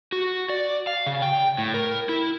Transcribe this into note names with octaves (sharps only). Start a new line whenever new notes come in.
F#4
D5
F5
C#3
G5
A2
A#4
E4